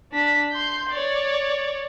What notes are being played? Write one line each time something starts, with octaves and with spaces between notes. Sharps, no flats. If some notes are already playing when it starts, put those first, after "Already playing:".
D4 B6
C6 G6
C#5 D5